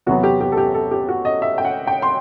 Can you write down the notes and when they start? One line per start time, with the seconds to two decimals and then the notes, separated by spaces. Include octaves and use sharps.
0.06 E2 C3 F#3 B3 F#4
0.23 G4
0.41 G4
0.52 A4
0.57 G4
0.74 A4
0.91 G4
1.09 F#4
1.25 D#5
1.42 E5
1.58 G5
1.65 F#5
1.87 G5
2.02 C6